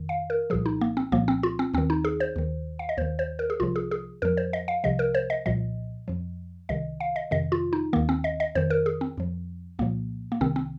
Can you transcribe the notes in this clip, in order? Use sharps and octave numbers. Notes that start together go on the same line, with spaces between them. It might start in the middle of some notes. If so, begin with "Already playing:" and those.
Already playing: F2 D#3
F5
A#4
C2 A#2 F3 G#4
D#4
A#3
C4
C2 A#2 F3 A#3
C4
F4
C4
D#2 D#3 C4
D#4
G#4
C5
D#2 D#3
F5
D#5
D#2 D#3 C5
C5
A#4
G#4
C2 C3 F3 F4
G#4
G#4
F2 F3 A#4
C5
D#5
F5
C2 C3 F3 D#5
A#4
C5
D#5
C2 A#2 F3 D#5
F2 F3
C2 C3 D#3 D#5
F5
D#5
F2 C3 D#3 D#5
F4
D#4
D#2 D#3 A#3
C4
D#5
D#5
F2 D#3 C5
A#4
G#4
C4
F2 F3
C2 A#2 F3 A#3
A#3
C2 C3 D#3 C4
C4